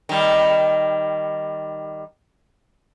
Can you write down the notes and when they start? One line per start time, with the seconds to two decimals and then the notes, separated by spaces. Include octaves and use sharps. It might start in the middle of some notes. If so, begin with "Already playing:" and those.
0.09 D#3 G3